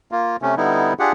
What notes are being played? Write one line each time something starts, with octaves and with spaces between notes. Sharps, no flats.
A#3 F4
C3 A3 C#4
D3 G3 B3 D#4 E4
D4 F4 G4 G#4 F#5